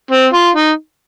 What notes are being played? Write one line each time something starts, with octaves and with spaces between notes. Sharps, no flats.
C4
F4
D#4